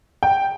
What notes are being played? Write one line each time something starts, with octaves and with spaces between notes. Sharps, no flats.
G5